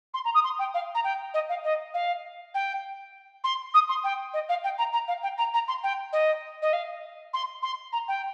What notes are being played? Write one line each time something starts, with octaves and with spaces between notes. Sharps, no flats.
C6
A#5
D#6
C6
G5
F5
A#5
G5
D#5
F5
D#5
F5
G5
C6
D#6
C6
G5
D#5
F5
G5
A#5
A#5
F5
G5
A#5
A#5
C6
G5
D#5
D#5
F5
C6
C6
A#5
G5